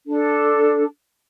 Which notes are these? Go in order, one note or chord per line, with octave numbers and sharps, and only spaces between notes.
D4 A4